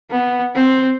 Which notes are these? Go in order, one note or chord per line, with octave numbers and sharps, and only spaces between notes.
B3
C4